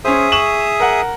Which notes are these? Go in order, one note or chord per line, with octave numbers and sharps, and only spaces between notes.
C#4 G#4 C5 E5 D#6
C#6 E7 F#7
A#4 F#5